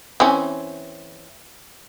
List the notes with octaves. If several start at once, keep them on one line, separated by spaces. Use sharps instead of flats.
E3 C4 C#4